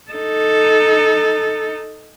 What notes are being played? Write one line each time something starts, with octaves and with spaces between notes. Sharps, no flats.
D#4 A4